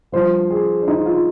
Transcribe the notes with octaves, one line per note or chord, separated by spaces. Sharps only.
G2 F3 C5
G#4
D4
D#4
F4